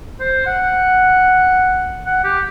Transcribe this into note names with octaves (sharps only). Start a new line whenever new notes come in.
C5
F#5
F#5
G4